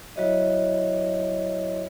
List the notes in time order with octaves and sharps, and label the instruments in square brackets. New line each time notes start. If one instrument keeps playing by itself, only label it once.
[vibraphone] F#3 E4 F#4 C#5 D#5 E5